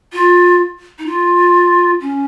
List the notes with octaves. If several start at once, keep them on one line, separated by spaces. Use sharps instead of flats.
F4
D#4
F4
C#4